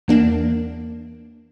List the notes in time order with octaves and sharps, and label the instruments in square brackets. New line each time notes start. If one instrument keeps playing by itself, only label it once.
[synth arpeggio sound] E2 A#3 D4